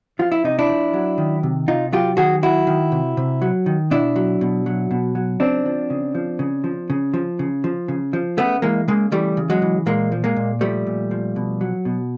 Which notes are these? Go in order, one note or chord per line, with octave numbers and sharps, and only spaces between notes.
F3 F4
E4
C3 D#4
D4 E4
F3
F#3
D#3
C3
C3 D#4 F4
F#3 F4 G4
D#3 F#4 G#4
F#3 E4 F#4
D#3
C3
C3
F#3
D#3
B2 D4 E4
F#3
B2
F#3
B2
F#3
C#3 C4 D4
F3
C#3
F3
C#3
F3
C#3
F3
C#3
F3
C#3
F3
C#3 A3 B3
E3 G#3 A#3
C#3 G#3 A#3
E3 G3 A3
C#3
F#3 G#3
E3
A#2 G#3 A#3
F3
G#3 A#3
A#2
F3 G3 A3
A#2
F3
B2
F#3
B2